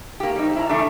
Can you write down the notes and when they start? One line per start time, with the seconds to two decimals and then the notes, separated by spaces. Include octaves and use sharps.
0.20 A#3 G4
0.36 G3 C4 D#4
0.56 E4 A#5
0.69 E3 A3 D4